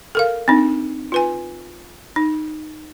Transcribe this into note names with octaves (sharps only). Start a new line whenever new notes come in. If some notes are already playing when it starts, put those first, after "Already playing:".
A4 A#4 F5
C4 D4 D#4
F4 B4 G#5
D#4